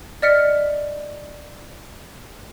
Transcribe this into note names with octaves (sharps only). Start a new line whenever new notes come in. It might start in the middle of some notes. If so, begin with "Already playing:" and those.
D5 D#5 F6 B6 C#7